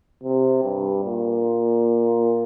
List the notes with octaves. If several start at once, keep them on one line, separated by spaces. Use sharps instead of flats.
C3
G2
A#2